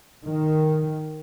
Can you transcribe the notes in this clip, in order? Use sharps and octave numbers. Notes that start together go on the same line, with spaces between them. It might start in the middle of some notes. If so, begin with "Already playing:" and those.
D#3